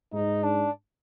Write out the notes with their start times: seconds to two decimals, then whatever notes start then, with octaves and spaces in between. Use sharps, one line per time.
0.13 G#2 D#4
0.43 D4